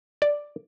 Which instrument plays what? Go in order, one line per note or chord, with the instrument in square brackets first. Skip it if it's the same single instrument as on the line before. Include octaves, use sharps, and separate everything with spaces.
[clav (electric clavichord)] D5